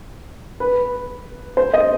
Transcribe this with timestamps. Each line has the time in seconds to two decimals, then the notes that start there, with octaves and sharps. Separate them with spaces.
0.60 B4
1.57 C5
1.73 D#5